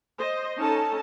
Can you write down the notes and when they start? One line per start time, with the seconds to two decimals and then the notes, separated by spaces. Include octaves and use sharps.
0.20 C5 D#5
0.58 C#4 D#4 A4 A5